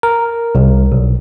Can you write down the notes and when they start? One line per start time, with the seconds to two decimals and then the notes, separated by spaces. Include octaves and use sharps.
0.03 A#4
0.55 C2
0.92 B1